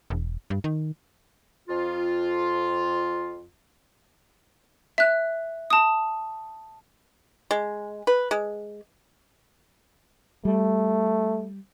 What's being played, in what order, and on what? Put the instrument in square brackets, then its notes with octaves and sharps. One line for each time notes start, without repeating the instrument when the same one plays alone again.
[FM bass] E1
G2
D#3
[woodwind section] F2 F4
[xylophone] E5 F#6
A5 D#6
[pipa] G#3
B4
G#3
[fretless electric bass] G3 [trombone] A3